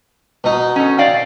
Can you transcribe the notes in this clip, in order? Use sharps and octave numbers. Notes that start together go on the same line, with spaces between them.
B2 D#4
C#4 A4
D5 F5 G5